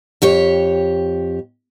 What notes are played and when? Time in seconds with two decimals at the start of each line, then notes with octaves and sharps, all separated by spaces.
0.22 F2 G4 C#5